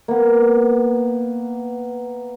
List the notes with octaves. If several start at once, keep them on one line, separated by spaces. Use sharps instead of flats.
A#3 B3